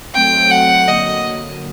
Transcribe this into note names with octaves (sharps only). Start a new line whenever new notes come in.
F#3 A3 C4 G5
F#3 A3 C4 F#5
D3 F#3 A#3 D#5